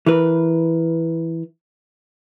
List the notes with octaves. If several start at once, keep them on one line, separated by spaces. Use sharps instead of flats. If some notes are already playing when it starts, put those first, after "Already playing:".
E3 A#4 B4